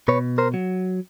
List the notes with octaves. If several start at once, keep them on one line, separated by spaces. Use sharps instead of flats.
B2 B4 C#5
A#4 C5
F#3